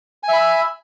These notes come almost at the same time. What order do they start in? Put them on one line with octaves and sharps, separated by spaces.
G#5 E5 B5 E6